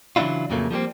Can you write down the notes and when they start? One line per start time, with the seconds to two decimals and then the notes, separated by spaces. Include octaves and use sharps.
0.16 C#3 E3 F#3 D4 E4 F4
0.50 F2 A#2 C#3 F#3 A3 A#3
0.71 F3 G3 A#3 C4